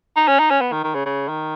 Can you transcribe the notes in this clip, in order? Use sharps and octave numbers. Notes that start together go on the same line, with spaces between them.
D#4
C#4
D#4
C#4
B3
D#3
D#3
C#3
C#3
D#3